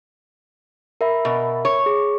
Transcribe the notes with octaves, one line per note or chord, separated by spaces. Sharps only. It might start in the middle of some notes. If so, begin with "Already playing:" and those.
A#4 E5 B5
B2
C#5
G#4